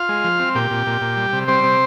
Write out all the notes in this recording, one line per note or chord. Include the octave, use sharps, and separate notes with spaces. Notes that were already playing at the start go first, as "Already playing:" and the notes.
Already playing: F4 F5
G#3
F3
C4
A#2 G4 G5
A#2
A#2
A#2
G3
C3
G3 C4 C5
C3